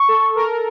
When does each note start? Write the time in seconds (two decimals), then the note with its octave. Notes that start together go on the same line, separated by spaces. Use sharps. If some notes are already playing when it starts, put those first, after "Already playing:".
Already playing: C#6
0.08 A4
0.36 A#4